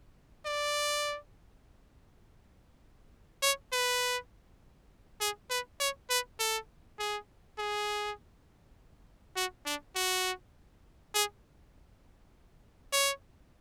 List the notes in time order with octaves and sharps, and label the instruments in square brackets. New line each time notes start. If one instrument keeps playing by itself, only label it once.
[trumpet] D5
C#5
B4
G#4
B4
C#5
B4
A4
G#4
G#4
F#4
D4
F#4
G#4
C#5